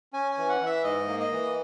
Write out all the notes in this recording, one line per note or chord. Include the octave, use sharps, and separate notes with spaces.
C#4 G#5
G#5
E3
F#5
E3 E5
G#2 D#5
A#3
D#5
E3